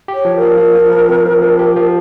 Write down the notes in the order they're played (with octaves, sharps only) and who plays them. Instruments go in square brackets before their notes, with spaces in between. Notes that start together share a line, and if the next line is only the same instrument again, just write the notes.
[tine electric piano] G4
[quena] C#5
[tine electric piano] F3
[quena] A#4
[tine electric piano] F3
F3
F3
F3
C4
F3
F3
G4
F3